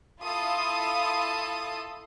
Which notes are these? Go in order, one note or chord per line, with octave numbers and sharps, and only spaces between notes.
E4 F4 A4 F5 D#6